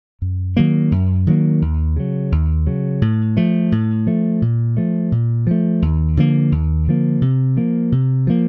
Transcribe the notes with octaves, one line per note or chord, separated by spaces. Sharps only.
F#2
D#3 F#3 A#3
F#2
D#3 F#3 A#3
D#2
C#3 F#3
D#2
C#3 F#3
A2
F3 A3
A2
F3 A3
A#2
F3 A3
A#2
F3 A3
D#2
D3 F3 A#3
D#2
D3 F3 A#3
C3
F3 A#3
C3
F3 A#3